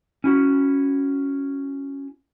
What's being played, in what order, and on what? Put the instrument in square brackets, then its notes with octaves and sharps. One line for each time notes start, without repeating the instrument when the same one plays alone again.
[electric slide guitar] C#4 E4 F#4